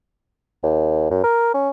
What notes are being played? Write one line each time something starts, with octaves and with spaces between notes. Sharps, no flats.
D#2
F#2
A#4
C#4